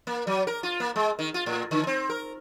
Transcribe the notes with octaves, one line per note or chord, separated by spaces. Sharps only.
A#3
F#3
A#4
F4
A#3
G#3
D#3
F4
A2
D3
C4
A#4